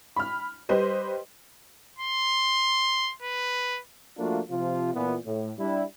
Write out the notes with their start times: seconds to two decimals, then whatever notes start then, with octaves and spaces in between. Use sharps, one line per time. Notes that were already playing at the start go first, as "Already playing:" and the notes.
0.16 B5 F6
0.69 G3 G4 B4 C5 D#5
1.98 C6
3.22 B4
4.18 F3 A3 A#3 D4 F4 F#4
4.50 C3 F3 F4
4.94 A#2 E3 B3
5.25 A2
5.59 G3 D4 E4